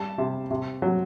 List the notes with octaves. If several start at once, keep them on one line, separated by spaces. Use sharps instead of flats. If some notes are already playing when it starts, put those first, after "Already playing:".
Already playing: G3 A5
C3
C3
F#3